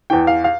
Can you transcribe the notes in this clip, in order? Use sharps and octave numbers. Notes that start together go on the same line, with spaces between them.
E2 E3 G5
F5
F5